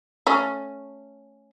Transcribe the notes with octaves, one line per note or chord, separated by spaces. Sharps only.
A3 C#4